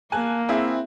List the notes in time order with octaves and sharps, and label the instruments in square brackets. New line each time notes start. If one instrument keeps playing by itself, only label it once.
[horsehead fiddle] A#3 [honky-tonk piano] G#5 A5 F#6
[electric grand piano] C4 E4 [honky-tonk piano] G#4 E5